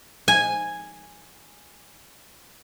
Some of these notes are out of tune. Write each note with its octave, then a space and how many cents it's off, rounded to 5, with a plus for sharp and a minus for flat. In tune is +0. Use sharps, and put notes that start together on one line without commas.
G#5 -5